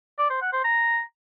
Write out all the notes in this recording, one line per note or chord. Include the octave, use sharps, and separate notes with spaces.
D5
C5
F#5
C5
A#5